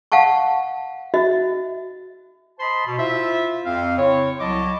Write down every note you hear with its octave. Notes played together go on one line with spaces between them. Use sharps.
F5 F#5 A5 C#6
F#4 D#5 E5
C5 D#5 A5 B5 C6
B2
E4 F4 C5 E5
F2 C4 F5
C#3 C4 E4 C#5
C2 F#3 E4 D#5 A5 D6